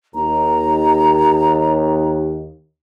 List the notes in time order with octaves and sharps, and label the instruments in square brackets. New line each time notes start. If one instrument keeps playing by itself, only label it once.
[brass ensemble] D#2 [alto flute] A#5